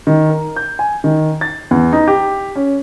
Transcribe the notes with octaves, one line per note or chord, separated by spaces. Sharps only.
D#3
A#4
G6
G#5
D#3
A6
E2
D#4
G4
C#4